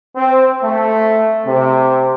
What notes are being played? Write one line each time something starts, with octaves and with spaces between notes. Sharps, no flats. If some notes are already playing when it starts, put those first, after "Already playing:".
C4
A3
C3